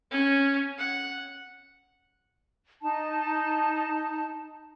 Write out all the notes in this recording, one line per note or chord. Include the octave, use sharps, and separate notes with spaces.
C#4
F#5
D#4 A5